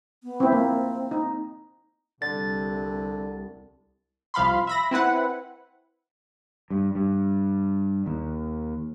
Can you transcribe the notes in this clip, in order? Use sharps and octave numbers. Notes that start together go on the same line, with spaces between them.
B3
C4 E4
A#3 C4
D#4
C2 D3 A6
C2 F3 F5 B5 C6
E5 B5 A#6
C4 E4 B4 F#5
G2
G2
D#2